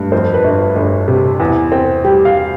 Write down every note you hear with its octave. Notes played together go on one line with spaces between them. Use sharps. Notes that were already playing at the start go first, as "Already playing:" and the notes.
Already playing: G2 A3
F2 C5
B4
G1
G1
C3
E2
C4
G3 G4
F5